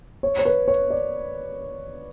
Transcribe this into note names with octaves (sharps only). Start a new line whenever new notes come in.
C#5
C#5
B4
C#5
D5